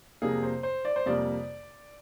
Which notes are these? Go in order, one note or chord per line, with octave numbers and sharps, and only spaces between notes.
F2 C3 G3 A#3 G#4
C5
C5
D5
C5
F2 C3 G3 A#3 D5